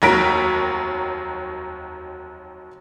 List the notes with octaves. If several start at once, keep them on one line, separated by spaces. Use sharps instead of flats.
F1 D#2 F#3 A#4 B6 D7